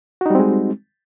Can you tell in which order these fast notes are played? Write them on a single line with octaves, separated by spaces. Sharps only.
F#4 D#4 G3 C4 G#3